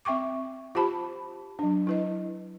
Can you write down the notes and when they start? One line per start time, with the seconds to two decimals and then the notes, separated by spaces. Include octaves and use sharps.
0.05 C4 E5 G5 C#6 D6
0.75 F4 G4 C5 A5 B5
1.59 F#3 D4
1.87 E4 B4 D#5